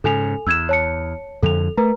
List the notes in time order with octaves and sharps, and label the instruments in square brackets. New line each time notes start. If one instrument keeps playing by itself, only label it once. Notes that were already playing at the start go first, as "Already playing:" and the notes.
[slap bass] G#2 C#3 [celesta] A4 G#5 F7
[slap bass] E2 [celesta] E6 G#6 E7
[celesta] C#5 A5 C#7
[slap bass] F2 D3 [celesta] A4 F7
[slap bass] A3 [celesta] A#4 B4 A#5